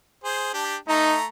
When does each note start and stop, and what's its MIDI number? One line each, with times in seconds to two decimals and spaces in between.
0.24 0.50 68
0.24 0.50 72
0.54 0.76 62
0.54 0.76 67
0.88 1.25 57
0.88 1.17 63
0.88 1.25 82